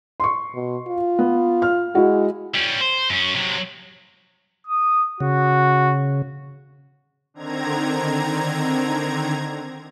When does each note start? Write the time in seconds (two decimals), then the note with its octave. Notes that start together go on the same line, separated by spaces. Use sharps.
0.20 C6 C#6
0.54 B2
0.88 F4
1.19 B3
1.62 F6
1.95 G#3 E4 F#4
2.55 G3 C#4
2.81 C5
3.10 F#2 C#4
3.35 C3 F#3
4.67 D#6
5.20 C#3 F#4
7.34 D3 D#3 C4 A#5 G#6